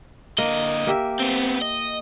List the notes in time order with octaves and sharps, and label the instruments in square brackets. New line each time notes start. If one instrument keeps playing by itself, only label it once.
[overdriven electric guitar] D3 D#5 [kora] A#3
[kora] A#3 G4 E5
[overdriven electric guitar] B3 C4
D#5